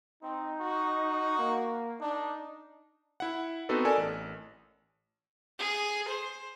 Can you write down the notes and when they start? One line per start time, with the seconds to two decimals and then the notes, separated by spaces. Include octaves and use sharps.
0.23 C4 D#4
0.61 F#4
1.39 A#3
2.00 D4 D#4
3.20 E4 F#5
3.69 B3 C4 D#4 F#4 A4 B4
3.85 A4 A#4 D5 G#5
3.97 A1
5.59 G#4
6.08 C5